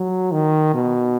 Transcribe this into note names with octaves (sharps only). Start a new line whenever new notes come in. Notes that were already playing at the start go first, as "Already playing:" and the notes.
Already playing: F#3
D#3
B2